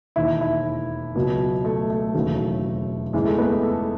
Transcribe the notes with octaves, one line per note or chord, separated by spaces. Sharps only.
E1 D#2 D#3 E4
E4
C#2 B2 F#3
A3
A3
E1 D#2 C#3 F#3
E2 C#3 E3 G#3
A3
B3
A4